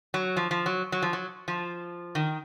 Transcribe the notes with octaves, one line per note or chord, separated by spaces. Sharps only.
F#3
F3
F3
F#3
F#3
F3
F#3
F3
D#3